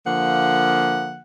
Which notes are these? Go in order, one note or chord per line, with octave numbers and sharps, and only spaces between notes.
D3 F3 A#3 F#5